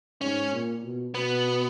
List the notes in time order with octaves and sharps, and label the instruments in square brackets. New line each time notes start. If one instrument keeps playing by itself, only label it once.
[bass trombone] G#2 [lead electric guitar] C#4
[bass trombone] A#2
B2
[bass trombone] B2 [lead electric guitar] B3